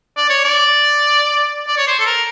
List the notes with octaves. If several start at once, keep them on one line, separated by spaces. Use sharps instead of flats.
D5
C#5
D5
D5
C#5
C5
A4
A#4